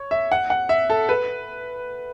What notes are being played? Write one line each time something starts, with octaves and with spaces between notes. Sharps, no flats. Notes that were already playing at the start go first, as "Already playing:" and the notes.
Already playing: C#5
E5
F#5
F#5
E5
A4
B4